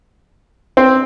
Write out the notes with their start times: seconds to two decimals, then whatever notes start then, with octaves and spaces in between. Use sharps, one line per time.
0.77 C4